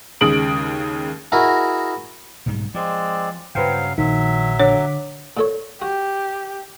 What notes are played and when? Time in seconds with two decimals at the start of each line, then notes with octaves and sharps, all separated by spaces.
0.21 D#2 C#3 G#3 D#6 D7 F#7
1.32 E4 F#4 G#4 A#4 D#5
2.46 B1 G#2 G3
2.75 F3 G#3 C4 D5
3.55 G2 C#3 F#3 B4 C5 F5 G5
3.98 A#1 D#3 F#3 E5
4.60 D3 C#5 F#5 D6
5.37 A#2 A4 C#5
5.82 F#4 G4